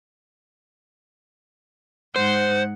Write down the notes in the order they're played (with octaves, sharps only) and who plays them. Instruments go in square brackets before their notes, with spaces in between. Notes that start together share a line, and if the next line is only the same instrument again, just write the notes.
[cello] G#2 F#5 [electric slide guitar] C5